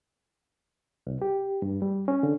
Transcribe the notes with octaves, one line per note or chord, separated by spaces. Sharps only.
C2
G4
G2
G3
C#4
D3